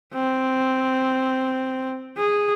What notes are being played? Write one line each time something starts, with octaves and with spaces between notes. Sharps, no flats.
C4
G#4